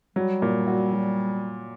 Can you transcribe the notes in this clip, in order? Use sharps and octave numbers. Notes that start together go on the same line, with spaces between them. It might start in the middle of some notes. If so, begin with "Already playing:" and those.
F#3 G3
A#2
F#4
F#3